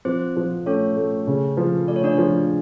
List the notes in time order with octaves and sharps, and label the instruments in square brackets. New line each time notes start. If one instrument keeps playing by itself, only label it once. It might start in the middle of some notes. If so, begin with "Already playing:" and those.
[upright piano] F3 [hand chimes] C4 C5
[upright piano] F3
[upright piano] A3 [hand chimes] C#4 C#5
[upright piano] A3
C#3
F3
[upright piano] A3 [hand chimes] D5
[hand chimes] C#5
D4 D5
[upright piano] F3